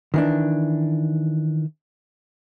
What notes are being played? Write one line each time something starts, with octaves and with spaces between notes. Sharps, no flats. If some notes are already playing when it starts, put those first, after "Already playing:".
D#3 E3 D4